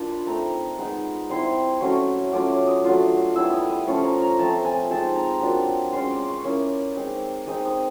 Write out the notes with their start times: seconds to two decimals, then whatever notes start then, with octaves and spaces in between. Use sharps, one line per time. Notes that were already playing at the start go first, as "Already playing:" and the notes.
Already playing: A#3 D4 F4
0.09 B5
0.26 A3 C4 D#4 A#5
0.78 G#3 B3 D#4
1.29 G3 C4 E4 C6
1.81 F#3 A3 C#4 C#6
2.32 F#3 A3 C#4 F4 D6
2.50 D6
2.67 D#6
2.84 F#3 A3 D4 F4
3.35 G3 B3 E4 E6
3.52 D#6
3.69 D#6
3.87 F3 A3 C#4 F4 C#6
4.04 A#5
4.22 A#5
4.39 F3 A3 C4 A5
4.65 G#5
4.91 G#3 C4 D#4 A5
5.15 A#5
5.41 F#3 A#3 D4 F4
5.93 G#3 C#4 F4 C6
6.11 D6
6.28 C#6
6.45 A#3 C#4 E4 D6
6.96 G#3 C4 D#4
7.47 G#3 C4 D#4 D#6
7.65 D#6